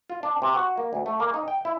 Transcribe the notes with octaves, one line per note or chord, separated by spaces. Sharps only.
F4
D4
C3
F#4
A#3
D2
A3
A#3
D#4
G5
E4